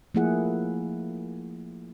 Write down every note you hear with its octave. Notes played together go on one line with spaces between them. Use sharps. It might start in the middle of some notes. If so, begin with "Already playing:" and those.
F3 A3 A#3 E4 G#4 F#5